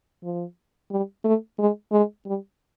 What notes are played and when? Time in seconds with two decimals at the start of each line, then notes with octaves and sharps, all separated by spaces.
0.23 F3
0.91 G3
1.24 A3
1.58 G#3
1.92 G#3
2.26 G3